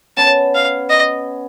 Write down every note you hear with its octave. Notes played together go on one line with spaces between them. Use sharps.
B3 C#4 A5
F5
D#5